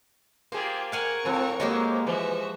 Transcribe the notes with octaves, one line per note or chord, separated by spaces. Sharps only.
A#3 F4 G4 G#4 C5
A#4 F5 F#5 G#5 C#6
G#2 F3 C4
F2 F#3 G#3 A#3 G4 C5
E3 F3 F#4 E5